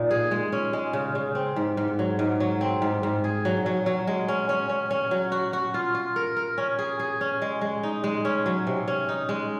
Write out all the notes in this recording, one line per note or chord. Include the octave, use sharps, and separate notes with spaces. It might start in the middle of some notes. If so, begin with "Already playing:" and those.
Already playing: A#2 D#4
G#4
G#3
C#4
G#3
C#3
C#3
C4
G#2
G#2
F#3
G#2
F#3
C4
G#2
G#2
G#4
F#3
F#3
F#3
G#3
C#4
C#4
C#4
C#4
F#3
F#4
F#4
F4
F4
A#4
A#4
C#4
G#4
G#4
C#4
G#3
G#3
D#4
G#3
C#4
F#3
C3
C#4
D#4
G#3